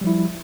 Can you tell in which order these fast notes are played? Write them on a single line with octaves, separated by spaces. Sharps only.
G3 F3 E4